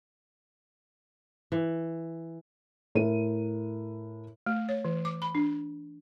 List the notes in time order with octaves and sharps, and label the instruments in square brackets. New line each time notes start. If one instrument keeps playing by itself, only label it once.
[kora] E3
[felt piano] A2 A#4 D#7
[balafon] A3
C#5
E3
D6
B5
D4